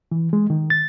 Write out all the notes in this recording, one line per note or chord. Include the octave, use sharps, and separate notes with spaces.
E3
G#3
D#3
A6